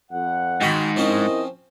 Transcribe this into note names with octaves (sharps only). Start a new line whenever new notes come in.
F2 F#5
G#2 D#3 F#4 B5
F3 C4 C#4 E4 A#4 D#5